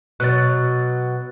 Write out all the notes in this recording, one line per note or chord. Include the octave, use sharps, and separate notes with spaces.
B2 F#3 F#6 A6